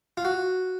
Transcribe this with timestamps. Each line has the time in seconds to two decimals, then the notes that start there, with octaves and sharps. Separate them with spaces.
0.17 F4
0.25 F#4